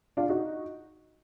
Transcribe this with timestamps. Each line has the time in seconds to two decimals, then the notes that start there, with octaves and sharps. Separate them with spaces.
0.17 D4 F4
0.29 D#4 F#4